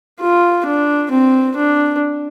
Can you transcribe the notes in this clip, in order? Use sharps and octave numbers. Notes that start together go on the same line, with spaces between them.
F4
D4
C4
D4